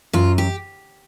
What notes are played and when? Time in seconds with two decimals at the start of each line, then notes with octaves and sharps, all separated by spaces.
0.13 F#2 F4
0.38 G4